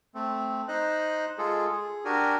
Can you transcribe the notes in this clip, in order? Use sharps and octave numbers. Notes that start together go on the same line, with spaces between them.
A3 C4
D#4 C5 D#5 F#6
G#3 F4 G#4 A4
G#4
D4 F#4 G4 A#4 G#5